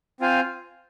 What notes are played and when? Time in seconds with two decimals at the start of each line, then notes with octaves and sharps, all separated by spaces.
0.21 C4 F4 C5 F5 G#5